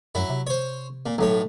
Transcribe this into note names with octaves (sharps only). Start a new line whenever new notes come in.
F#2 F#3 E4
C3
C5 C#5
A#2
B1 A2 F#3 C#5